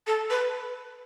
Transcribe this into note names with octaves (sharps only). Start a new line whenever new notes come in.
A4
B4